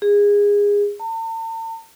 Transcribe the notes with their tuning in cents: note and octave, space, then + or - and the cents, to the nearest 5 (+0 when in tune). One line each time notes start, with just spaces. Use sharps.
G#4 -25
A5 +45